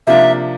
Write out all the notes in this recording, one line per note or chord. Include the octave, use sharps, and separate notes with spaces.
C3 F3 A#3 D4 F4 E5